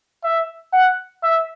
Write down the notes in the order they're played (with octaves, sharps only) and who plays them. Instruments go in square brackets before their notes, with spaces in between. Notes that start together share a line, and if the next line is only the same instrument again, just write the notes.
[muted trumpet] E5
F#5
E5